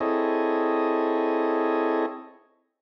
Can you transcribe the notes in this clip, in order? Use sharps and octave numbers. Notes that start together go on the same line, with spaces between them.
C4 E4 G#4 A4 C#5 D#5